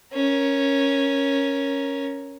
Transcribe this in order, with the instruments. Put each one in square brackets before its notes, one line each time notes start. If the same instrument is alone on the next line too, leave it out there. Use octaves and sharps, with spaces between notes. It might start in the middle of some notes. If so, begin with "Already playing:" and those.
[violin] C#4 A#4